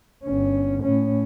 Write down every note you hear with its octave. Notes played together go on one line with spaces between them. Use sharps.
G1 C#4
A2 C#4